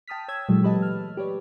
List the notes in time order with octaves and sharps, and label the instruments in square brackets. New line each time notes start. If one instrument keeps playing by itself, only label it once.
[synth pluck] G5 A5 D#6 F6 B6
C#5 E6 G#6
A#2 E3 F#3 G#3 A3
G4 B4 D#5 A5
F6
G4 B4 C#5 D5